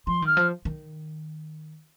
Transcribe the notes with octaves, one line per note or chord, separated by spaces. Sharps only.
F3 C6
D#3 F6
F3
D#3